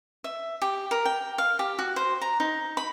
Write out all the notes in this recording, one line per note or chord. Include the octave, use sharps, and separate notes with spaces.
E5
G4
A#4
G5
F5
G4
F#4
C5
A#5
D#4
B5